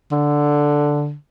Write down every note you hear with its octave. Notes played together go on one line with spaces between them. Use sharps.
D3